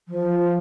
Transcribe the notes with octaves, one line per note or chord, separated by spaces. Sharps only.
F3